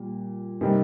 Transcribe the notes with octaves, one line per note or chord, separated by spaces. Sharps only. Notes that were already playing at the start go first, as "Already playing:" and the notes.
Already playing: A#2 G3
C3 D#3 G3 D#4